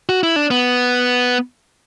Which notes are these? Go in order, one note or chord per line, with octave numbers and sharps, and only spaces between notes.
F#4
E4
D4
B3